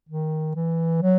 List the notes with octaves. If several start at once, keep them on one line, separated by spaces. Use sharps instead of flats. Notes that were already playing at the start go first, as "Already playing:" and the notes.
D#3
E3
F#3